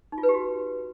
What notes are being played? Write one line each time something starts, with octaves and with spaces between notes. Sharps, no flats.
D#4
F4
B4
G4
F#4